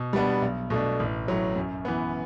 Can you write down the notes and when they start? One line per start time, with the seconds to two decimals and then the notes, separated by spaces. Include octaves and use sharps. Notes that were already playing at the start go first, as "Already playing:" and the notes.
Already playing: B2
0.13 G3 B3 D4
0.42 B1
0.70 B2 A3 D4
1.00 A1
1.28 A2 F#3
1.56 F#2
1.85 E3 B3